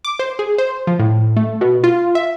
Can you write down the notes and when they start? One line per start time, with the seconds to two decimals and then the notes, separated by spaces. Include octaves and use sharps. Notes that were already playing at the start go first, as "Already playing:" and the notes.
0.04 D6
0.19 C5
0.39 G#4
0.58 C5
0.87 F3
0.99 A2
1.37 A3
1.61 B2
1.84 F4
2.15 E5